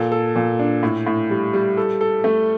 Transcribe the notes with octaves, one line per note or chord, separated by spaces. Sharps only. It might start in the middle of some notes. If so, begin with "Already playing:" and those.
Already playing: A#2 A4
A4
A#2
D4
A2
A2
G3
G3
A4
A4
A3